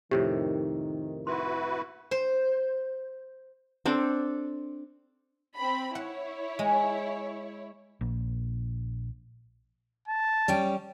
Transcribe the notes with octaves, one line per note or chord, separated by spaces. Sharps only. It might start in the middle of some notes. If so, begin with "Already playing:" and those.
F2 A2 C3 D#3 G4
E4 F#4 B4 C6
C5
C4 D4 A4
C4 B5
E4 C#5 F#5
G#3
A#1
A5
G3 C#4 G5